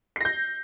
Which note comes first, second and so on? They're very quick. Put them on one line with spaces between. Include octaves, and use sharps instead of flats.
C7 A#6 G6